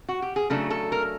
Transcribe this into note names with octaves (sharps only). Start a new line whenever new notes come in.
F#4
G4
G#4
C#3 F#3 A3 D4 A4
A4
A#4